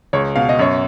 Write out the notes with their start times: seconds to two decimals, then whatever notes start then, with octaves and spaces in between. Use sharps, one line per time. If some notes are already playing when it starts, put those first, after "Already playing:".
0.13 C#2 C#5
0.36 B2 F5
0.49 D#5
0.59 F#2 C#5